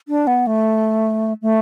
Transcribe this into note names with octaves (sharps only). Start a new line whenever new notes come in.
D4
B3
A3
A3